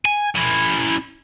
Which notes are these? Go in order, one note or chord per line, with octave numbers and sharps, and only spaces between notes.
G#5
C#4 E4